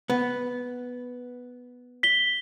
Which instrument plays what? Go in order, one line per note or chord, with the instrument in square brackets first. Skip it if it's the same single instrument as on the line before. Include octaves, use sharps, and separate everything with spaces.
[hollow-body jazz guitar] B3
[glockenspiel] B6 G7